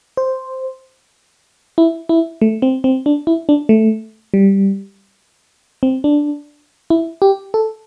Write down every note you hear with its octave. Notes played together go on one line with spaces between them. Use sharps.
C5
E4
E4
A3
C4
C4
D4
E4
D4
A3
G3
C4
D4
E4
G4
A4